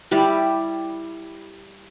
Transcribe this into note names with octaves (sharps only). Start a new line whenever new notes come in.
G3 E4 G4 D5